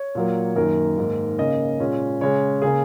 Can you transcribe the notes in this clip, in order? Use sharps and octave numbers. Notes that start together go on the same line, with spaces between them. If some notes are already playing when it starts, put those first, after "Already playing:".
Already playing: C#5
A#2 F#3 A#3
F#2 D#3 A#3 A#4
G#2 D#3 A#3
C#3 A#3 C#4 D#5
A#2 G#3 C#4
C#3 G#3 C#4 C#5
C#3 A#3 C#4 G#4